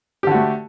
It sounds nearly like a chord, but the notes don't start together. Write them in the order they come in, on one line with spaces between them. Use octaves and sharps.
G4 D3 F#4 A3